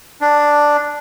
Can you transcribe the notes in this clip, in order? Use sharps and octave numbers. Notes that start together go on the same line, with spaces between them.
D4